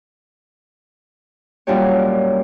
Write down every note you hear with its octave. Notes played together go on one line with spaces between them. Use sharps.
F#2 A#2 G3 D4 G4 C#5